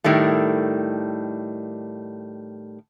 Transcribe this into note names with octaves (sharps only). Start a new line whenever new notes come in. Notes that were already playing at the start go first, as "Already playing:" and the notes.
A2 D#3 G3 A3